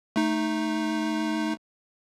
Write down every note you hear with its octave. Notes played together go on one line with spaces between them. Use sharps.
A3 D#4